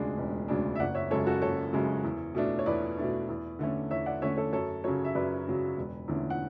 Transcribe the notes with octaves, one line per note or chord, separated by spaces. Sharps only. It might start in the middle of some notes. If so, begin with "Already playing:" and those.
Already playing: E1 D2 C#3 G#3 D4 G#4
E1
D2 C#3 G#3 D4
E5
F#1 D5 F#5
C#5 E5
F#2 C#3 G#3 A4 C#5
F#4 A4
F#1 A4 C#5
F#2 C#3 G#3
E2
B2 A3 D4
C#5
E2 B4 D5
B2 A3 D4
E2
D3 A3 C#4
E2 C#5 E5
D5 F#5
D3 A3 C#4 C#5 E5
A4 C#5
F#2 A4 C#5
C#3 F#3 A4 C#5
E5
F#2 B4 D5
C#3 F#3
E1
E2 D3 A3 C#4
F#5